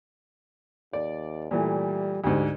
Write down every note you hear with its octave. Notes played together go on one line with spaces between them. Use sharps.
D#2 D5
A#2 E3 G3 A3
D2 G#2 G4